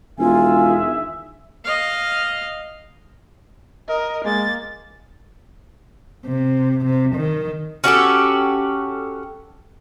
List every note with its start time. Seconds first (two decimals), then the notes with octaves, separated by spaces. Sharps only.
0.19 E1 D#3 F4 G#4 E5 G#5
1.64 D#5 F5
3.89 A#4 D#5
4.24 G#3 A#3 A6
6.26 C3
6.85 C3
7.16 D#3
7.84 C#4 F#4 G4 A4